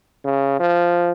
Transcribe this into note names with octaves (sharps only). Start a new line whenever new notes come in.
C#3
F3